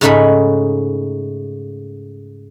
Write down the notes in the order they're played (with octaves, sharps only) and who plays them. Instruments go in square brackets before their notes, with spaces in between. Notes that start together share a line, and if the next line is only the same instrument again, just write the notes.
[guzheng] G#2 C#3 A3 D#4 F#5 B5